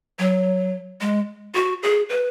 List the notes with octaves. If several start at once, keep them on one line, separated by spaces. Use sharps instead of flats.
F#3
G#3
F#4
G#4
B4